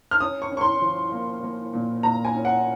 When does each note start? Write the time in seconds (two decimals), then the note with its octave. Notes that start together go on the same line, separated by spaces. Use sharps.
0.11 F6
0.20 C#4 D#6
0.42 C#6
0.52 C#4
0.57 C#6
0.61 C6
0.81 F3
1.12 A#3
1.43 A#3
1.74 A#2
2.03 A#2 A#5
2.25 G#5
2.34 C#4
2.45 F#5